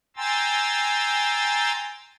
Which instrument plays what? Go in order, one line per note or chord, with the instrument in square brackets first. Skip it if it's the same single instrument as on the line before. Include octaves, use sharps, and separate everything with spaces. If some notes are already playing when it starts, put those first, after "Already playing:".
[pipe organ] G5 G#5 A#5 C6 E6 A6